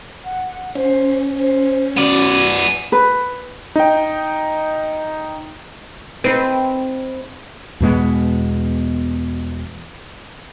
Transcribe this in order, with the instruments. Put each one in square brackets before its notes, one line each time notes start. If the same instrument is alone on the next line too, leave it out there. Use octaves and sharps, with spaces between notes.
[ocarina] F#5
[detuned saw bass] C#4 [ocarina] C5
[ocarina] C5
[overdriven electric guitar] B3 D5 [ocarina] F#4
[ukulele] B4
[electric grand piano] D#4 G5
[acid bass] C4 [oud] D#4 B4
[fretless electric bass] E2 B2 G#3 B3